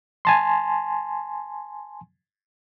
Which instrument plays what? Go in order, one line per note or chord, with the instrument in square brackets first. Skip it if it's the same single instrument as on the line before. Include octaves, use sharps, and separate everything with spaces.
[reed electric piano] G#5 A5 C6